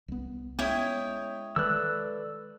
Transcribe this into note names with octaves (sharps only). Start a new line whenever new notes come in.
C2 B3
G#3 B3 C#4 E4 C#5 G5 D#6
D#3 G#3 A4 B4 D5 E6 F#6